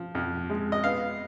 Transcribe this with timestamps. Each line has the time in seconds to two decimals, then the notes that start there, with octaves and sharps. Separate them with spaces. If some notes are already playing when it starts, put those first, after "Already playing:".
Already playing: F3
0.15 F2
0.50 G#3
0.72 D#5
0.84 B3 F5